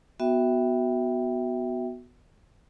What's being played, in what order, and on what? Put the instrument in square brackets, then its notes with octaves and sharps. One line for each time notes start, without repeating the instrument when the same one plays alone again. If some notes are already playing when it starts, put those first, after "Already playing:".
[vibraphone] B3 F#4 E5 G5